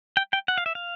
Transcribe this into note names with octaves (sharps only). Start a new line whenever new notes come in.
G5
G5
F#5
F5
E5
F5